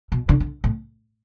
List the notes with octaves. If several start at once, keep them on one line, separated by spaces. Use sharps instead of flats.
B2
D3
D3
A2